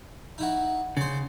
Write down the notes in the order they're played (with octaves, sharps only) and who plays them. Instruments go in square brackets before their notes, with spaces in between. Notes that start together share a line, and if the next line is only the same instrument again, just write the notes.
[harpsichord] D#4 E4 F#4
[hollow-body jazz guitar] C#3 [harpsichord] C5 D5